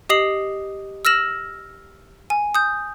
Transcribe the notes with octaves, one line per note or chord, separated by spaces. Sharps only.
G4 D#5 D#6 C7 F#7
E6 F6 A#6 E7 F#7
G#5
D#6 G6